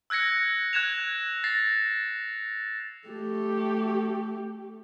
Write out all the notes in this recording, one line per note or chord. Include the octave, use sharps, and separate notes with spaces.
E6 F#6 G#6 A#6 C#7
F#6 G#6 E7 F7
A6 A#6 C7
A3 G4